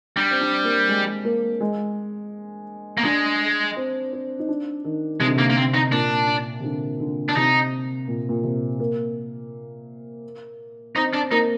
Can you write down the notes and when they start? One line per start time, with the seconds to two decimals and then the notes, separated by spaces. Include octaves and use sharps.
0.17 G3 D4
0.31 C4
0.41 D4
0.64 A#3
0.89 G#3
1.25 A#3
1.61 G#3
2.98 A#3
3.04 G#3 D4
3.77 C4
4.13 C4
4.39 D#4
4.49 D4
4.85 D#3
5.20 C3 G#3
5.28 D3
5.36 C3 A#3
5.50 A#3
5.56 C4
5.74 D#4
5.92 A#2 D4
6.60 C3
6.64 D3
7.00 D3
7.29 D4
7.36 C3 D#4
8.08 A#2
8.29 A#2
8.44 C3
8.80 A#3
10.95 C4 D#4
11.13 D4
11.31 A#3 D#4